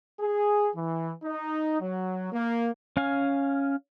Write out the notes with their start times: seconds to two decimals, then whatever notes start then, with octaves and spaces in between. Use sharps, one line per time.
0.19 G#4
0.75 E3
1.24 D#4
1.80 F#3
2.32 A#3
2.97 C#4 F5 G#5